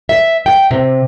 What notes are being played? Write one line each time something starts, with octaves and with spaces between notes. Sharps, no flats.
E5
G5
C3